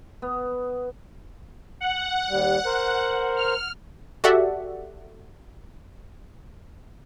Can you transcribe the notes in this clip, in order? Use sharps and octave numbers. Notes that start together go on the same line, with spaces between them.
B3
F#5
D#2 G3
A#4 C5
F6
F#4 G4 A4 D5 E5 F#5